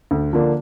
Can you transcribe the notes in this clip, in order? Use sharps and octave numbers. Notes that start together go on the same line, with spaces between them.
D2
D3 F3 A#3 D4